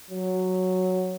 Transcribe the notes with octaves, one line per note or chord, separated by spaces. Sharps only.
F#3